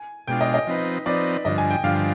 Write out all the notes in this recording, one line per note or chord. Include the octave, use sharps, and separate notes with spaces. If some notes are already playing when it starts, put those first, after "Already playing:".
Already playing: G#5
B2 G#3 D4 F4 G5
D#5
D#5
F3 C4 D#4 B4
F3 C4 D#4 B4 D5
G2 D3 F3 D#5
G#5
G5
G2 D3 F3 F5